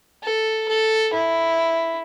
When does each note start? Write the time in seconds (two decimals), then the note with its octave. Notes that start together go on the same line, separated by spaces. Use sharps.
0.24 A4
0.69 A4
1.14 E4